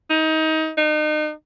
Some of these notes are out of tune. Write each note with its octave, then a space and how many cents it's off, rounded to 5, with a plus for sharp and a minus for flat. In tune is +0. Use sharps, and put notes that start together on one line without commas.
D#4 +25
D#4 -35